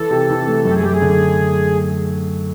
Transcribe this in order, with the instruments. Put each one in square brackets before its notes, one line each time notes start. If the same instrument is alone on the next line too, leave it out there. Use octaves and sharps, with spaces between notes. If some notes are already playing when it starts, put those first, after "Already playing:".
Already playing: [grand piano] E3 [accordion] A4
[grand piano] C3
E3
A3
[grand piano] F#2 [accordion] A4
[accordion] G4
G#4
[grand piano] F#2 [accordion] G4
[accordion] G#4
[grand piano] D3